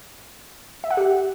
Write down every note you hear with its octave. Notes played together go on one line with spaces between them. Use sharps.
E5
F#5
G4